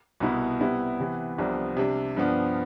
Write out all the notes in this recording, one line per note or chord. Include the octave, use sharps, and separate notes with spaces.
C2 B2 B3 E4
C3 G3 B3 E4
C3 E3 B3
C2 C3 F3 B3 D4
C3 G3 D4
G2 F3 B3 D4